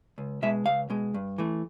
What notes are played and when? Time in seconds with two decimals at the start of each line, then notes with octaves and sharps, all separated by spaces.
0.18 C#2
0.42 B2 G#3 E5
0.66 C#2 F5
0.90 B2 G#3
1.14 G2
1.38 E3 A3